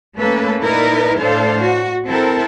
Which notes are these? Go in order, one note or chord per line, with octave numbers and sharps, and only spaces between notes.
A3 A#3 C#4 A4 B4
A#2 D#4 E4 A#4 B4 D5
A2 D4 A4 C5 F5
F#4
C4 E4 A4 A#4